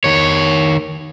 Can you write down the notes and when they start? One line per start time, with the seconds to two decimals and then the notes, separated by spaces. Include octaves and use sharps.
0.04 D#3 C#5